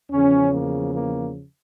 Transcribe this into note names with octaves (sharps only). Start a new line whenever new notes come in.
E2 C#3 F3 C#4
A#3
A#3